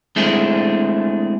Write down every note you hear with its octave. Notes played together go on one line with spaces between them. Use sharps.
G#3 A3 C4 D4 E4 G#4